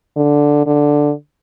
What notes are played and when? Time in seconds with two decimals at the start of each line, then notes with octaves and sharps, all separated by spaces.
0.16 D3
0.66 D3